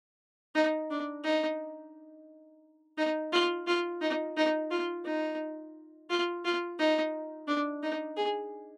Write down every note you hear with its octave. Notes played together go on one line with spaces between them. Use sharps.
D#4
D4
D#4
D#4
F4
F4
D#4
D#4
F4
D#4
F4
F4
D#4
D4
D#4
G#4